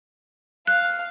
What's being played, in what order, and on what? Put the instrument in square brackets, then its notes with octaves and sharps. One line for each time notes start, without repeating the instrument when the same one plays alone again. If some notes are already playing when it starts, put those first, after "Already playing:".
[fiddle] F5 [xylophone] F#6